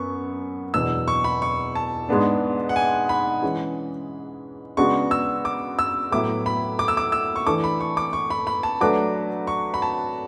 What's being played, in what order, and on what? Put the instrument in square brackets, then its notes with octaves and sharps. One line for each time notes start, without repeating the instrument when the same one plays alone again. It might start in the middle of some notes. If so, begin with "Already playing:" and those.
Already playing: [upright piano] F#2 B3 [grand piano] C#6
[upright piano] E2 B2 F#3 B3 D4 [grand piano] E6
[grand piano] C#6
B5
C#6
A5
[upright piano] G#2 G#3 B3 D4
[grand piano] F#5
G#5
B5
[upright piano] E3 G#3 C#4
[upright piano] C#3 G#3 B3 D4 F#4 [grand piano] C#6
[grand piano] E6
D6
E6
[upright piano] A2 F#3 B3 E4 [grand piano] D6
[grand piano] B5
D6
E6
D6
E6
C#6
[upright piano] E3 A3 D4 A4 [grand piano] D6
[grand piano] B5
C#6
D6
C#6
B5
B5
A5
[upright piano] F#3 A3 D4 F#4 B4 [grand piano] D6
[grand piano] C#6
B5
A5